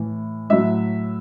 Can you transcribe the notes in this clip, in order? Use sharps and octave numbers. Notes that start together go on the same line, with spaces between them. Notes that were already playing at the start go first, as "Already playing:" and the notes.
Already playing: A2 E3
A2 F#3 E5